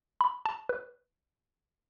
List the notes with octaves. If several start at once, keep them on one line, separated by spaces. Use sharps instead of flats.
B5
A5
B4